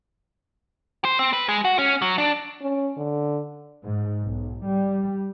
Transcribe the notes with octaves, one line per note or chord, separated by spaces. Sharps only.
C5
C4
B4
G#3
F#4
C#4
F#3
D4
C#4
D3
G#2
B1
G3